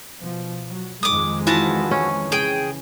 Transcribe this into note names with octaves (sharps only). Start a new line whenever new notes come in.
B2 F3
F#3
F2 D#3 G#3 D6 D#6
E3 F3 E4 F#4 A5
C#4
C#3 G#4 G5